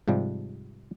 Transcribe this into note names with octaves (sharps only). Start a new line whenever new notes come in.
G#2 C3 F3 G3